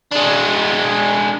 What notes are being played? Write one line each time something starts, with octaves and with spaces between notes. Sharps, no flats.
G#3 D4